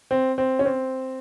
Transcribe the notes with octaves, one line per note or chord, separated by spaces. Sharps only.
C4
C4
C#4
C4